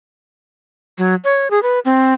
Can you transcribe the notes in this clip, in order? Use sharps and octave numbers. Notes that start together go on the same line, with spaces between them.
F#3
C#5
G#4
B4
C4